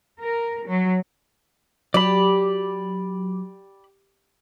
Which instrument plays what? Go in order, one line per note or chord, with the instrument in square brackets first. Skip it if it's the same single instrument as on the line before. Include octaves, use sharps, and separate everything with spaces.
[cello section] A#4
F#3
[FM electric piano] F#3 [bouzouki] G4 [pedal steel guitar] D5 B5